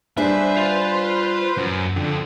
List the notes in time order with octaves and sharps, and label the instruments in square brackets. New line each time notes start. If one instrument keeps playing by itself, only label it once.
[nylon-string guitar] G3 D4 G#4 [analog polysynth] B4 C5 [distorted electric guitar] E5
[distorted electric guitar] F4
F#2
[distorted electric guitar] F2 [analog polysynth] D3